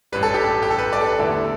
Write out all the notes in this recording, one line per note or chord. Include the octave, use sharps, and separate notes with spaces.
A1 G2 G3 B4
A4
G4
A4
G4
A4
B4
D5
A4
B4
E2 D3 A3 E4 A4